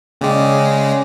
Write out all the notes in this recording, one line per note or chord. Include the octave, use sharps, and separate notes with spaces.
C#3 G#3 C#4 D5 G5